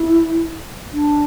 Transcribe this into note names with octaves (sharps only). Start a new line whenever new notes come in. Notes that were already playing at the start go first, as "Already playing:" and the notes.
Already playing: E4
D4